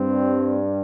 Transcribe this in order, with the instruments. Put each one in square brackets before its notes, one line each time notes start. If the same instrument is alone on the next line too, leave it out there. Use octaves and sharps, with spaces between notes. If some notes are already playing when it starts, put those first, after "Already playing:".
Already playing: [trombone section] G2 G3 C4